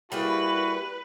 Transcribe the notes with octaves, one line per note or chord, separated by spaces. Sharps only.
G3 A#3 E4 F#4 G#4 B4